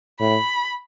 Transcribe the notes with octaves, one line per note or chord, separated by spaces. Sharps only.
A2 B5